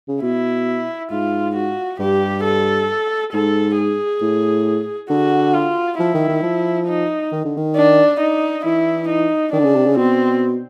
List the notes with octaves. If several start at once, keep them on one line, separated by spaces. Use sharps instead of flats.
C#3
B2 E4
G#2 F4
F#4
G2 G4
A4
G#2 A4
G#4
A2
D3 F#4
F4
F3 E4
D#3
D#3
F3
D#4
D#3
D3
D#3
D4
D#4
E3 E4
D#4
D#3 D4
D3
C#3
C3
C#3
B2 C4